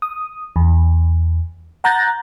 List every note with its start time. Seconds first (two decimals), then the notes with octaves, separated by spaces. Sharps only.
0.02 D#6
0.56 E2
1.84 F#5 A#5 F#6 G6 A6 A#6